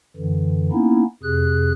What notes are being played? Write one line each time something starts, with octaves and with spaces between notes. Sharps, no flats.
F#2 D3 E3
A#3 B3 C#4 D#4 E4
F2 C3 G#4 F#6